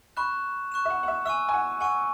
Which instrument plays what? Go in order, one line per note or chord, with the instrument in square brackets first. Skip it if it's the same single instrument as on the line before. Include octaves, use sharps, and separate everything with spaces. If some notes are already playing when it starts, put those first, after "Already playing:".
[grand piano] B5 [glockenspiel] C#6 F#6 E7
[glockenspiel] C#6 F#6 E7
[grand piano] E5
F#5
F#5
E5
[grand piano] E5 [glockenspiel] G#5 C#6 E6
[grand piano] G#5
F#5
[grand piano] F#5 [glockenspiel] G#5 C#6 E6